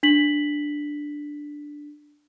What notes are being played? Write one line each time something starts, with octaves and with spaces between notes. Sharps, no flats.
D4 B6 F#7